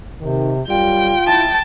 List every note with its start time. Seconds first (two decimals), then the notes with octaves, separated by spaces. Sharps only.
0.21 C3 D#3
0.68 F#2 G3 F4 G5
1.27 E4 A5